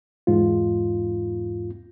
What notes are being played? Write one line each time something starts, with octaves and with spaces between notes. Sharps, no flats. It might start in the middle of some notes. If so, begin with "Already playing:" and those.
E2 G#2 F4